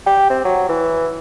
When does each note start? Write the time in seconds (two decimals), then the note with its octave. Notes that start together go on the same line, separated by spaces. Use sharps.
0.06 G4
0.30 C4
0.45 F#3
0.69 E3